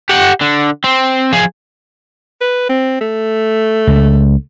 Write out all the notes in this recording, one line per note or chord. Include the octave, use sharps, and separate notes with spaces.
G4 F#5
D3
C4
F3 G#4
B4
C4
A3
C#2